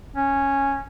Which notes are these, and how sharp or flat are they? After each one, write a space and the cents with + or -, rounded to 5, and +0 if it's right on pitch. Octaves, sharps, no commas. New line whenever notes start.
C#4 -5